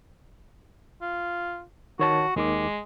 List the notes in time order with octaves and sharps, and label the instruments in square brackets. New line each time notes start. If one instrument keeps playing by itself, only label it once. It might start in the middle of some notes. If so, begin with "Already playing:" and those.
[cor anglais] F4
[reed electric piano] D#3 C#5 A5 [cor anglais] F#4
[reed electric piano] D#2 D#3 D6 [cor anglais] G#3